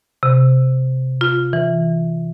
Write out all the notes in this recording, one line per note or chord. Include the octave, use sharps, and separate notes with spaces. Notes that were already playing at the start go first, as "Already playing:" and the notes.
C3
F4
E3